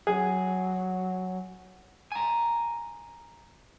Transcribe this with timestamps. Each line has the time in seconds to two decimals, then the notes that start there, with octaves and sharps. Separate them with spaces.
0.07 F#3 G#4
2.12 G#5 A#5